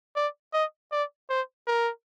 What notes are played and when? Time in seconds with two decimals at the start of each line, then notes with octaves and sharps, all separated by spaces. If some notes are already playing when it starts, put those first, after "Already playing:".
0.16 D5
0.53 D#5
0.92 D5
1.30 C5
1.67 A#4